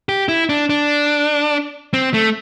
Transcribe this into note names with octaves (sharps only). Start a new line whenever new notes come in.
G4
E4
D4
D4
C4
A3